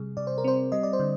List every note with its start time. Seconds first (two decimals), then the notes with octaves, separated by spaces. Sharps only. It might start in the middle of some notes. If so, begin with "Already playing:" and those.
Already playing: C3 G3 G#4
0.17 C3 D5
0.27 C5
0.38 A#4
0.44 C4 C5
0.72 G3 D#5
0.83 D5
0.93 C5
0.99 D3